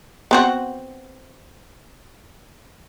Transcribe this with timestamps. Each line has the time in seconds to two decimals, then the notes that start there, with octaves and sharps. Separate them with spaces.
0.31 B3 C4 F#4